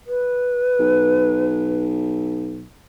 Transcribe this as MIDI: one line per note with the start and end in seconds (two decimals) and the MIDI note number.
0.07 1.82 71
0.79 2.68 35